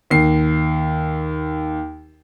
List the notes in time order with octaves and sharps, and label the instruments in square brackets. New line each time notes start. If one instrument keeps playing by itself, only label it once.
[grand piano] D#2 C7